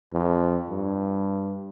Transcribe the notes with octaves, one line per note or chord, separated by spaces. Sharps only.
F2
G2